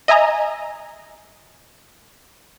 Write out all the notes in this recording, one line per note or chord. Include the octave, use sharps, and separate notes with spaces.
D#5 E5 G#5 A#5